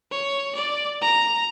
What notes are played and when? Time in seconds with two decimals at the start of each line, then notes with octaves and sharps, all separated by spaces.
0.11 C#5
0.55 D5
1.01 A#5